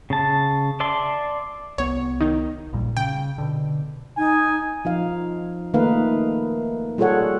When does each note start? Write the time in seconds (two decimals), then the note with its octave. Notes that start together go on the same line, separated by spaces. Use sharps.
0.10 C#3 A5
0.80 D5 E5 A5 C6
1.78 C2 B3 C#5
2.21 D#3 D#4
2.73 A#1 A#2 G3
2.97 C#3 G5
3.38 B2 D3
4.18 D#4 G#5
4.85 F3 D#4 F5
5.74 D#3 A3 A#3 D#4 B4 F5
6.98 G3 F4 G#4 A4 C#5 F#5